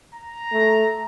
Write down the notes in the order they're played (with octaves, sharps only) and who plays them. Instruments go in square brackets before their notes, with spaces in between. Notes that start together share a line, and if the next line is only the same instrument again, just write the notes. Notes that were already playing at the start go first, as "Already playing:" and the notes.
[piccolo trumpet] A#5
[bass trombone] A3